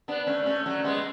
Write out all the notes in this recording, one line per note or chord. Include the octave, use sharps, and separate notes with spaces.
B3 D4
A3 C#4
A3 C#4
F#3 A3
G#3 B3